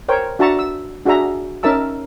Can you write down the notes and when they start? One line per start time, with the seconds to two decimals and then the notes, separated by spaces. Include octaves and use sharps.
0.08 A#4 C5 C#5 G5
0.39 D4 F#4 E5 A5 A#5 C#6
0.59 E6
1.05 D4 F#4 G#4 E5 A#5
1.63 C#4 D#4 A#4 E5 A5 E6